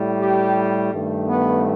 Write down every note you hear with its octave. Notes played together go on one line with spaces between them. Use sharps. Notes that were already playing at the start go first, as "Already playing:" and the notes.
Already playing: A2 G3
G4
G2 D#3 A3
B3